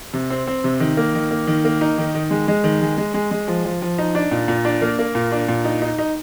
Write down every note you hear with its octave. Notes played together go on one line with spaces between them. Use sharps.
C3
C4
C4
C3
D#3
A#3
D#3
A#3
D#3
A#3
D#4
D#3
D#3
G#3
G#3
D#3
G#3
G#3
G#3
G#3
F3
F3
F3
D#4
D4
A#2
A#2
D4
A#3
A#3
A#2
D4
A#2
D#4
D#4
D#4